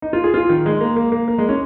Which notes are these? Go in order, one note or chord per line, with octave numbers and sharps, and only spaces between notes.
D#4
F4
G#4
F4
D#3
G#3
A#3
A#3
A#3
A#3
G#3
C#4